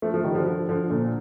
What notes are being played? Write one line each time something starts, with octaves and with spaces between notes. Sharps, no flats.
F3 A3
F3 A3
D#3 G3
D3 F3
D3 F3
D3 F3
A#2 D3